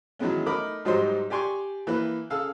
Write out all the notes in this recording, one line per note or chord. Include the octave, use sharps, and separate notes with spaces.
D#3 E3 F#3 G#3 B3 C#4
A3 D#4 A#4 B5 D6
G#2 F#3 G3 D#4 C5 C6
G4 D5 G#5 C6 C#6
E3 A#3 B4
C#3 G#4 A4 F5 E6